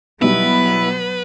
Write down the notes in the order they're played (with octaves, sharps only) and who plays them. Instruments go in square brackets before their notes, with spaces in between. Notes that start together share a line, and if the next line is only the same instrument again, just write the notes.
[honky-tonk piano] B2 G3 [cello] F#3 B3 [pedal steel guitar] E4 [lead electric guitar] B4